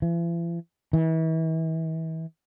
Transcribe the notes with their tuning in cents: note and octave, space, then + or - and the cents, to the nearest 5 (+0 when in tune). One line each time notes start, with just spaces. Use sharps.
E3 +45
E3 -35